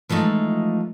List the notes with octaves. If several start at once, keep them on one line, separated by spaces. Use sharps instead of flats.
E3 F3 G#3 A3 D#4